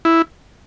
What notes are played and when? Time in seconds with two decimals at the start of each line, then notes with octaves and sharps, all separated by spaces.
0.05 E4